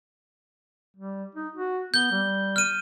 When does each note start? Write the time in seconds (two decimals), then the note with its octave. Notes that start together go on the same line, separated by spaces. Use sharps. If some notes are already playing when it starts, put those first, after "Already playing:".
0.97 G3
1.35 D#4
1.56 F#4
1.94 B3 G6 G7
2.11 G3
2.56 F6 D#7